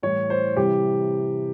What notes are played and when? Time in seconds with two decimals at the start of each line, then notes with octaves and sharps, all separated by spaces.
0.03 A2 E3 G3 C#5
0.30 C5
0.57 C3 E3 G3 G4